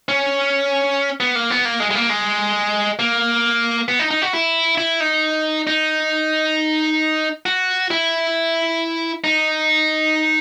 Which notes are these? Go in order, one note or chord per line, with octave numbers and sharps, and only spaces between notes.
C#4
B3
A#3
B3
A#3
G#3
G#3
A#3
G#3
A#3
B3
D#4
D#4
F#4
E4
E4
D#4
D#4
F#4
E4
D#4